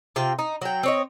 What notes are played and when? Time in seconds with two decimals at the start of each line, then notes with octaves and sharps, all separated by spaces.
0.16 C3 F4 G5
0.39 D#4
0.62 F#3 G5
0.83 C4 C#5 D#5